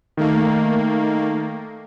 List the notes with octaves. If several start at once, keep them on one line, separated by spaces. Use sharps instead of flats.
D#3 A3 A#3